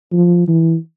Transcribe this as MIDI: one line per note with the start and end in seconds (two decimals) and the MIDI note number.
0.13 0.46 53
0.48 0.76 52